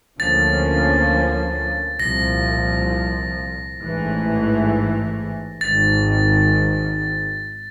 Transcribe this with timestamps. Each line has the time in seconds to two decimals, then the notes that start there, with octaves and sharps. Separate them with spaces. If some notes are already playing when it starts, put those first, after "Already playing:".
0.19 D2 D3 F3 A#3 C#4 A6
2.00 C2 A#2 F3 A#6
3.81 A1 G#2 E3 A3
5.61 G#1 G#2 D#3 A6